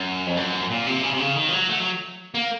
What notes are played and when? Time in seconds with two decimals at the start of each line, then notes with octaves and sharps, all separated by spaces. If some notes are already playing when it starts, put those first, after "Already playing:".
Already playing: F#2
0.26 F2
0.37 F#2
0.70 A#2
0.87 C3
1.03 C#3
1.13 C3
1.20 C#3
1.36 D#3
1.48 F3
1.52 F#3
1.69 A3
1.80 F#3
2.35 A#3